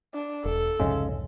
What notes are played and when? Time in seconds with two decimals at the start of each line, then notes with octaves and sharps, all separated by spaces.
0.14 D4
0.45 E1 A4
0.80 C2 F2 G#2 C#3 G#3 E5